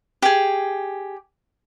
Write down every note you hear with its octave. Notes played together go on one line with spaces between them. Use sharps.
G4 G#4